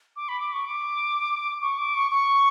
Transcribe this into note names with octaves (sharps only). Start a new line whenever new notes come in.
D6
B5
D6
C#6
D6
C#6
D6
C#6
C#6